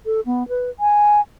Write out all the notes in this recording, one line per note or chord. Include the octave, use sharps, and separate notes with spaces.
A4
B3
B4
G#5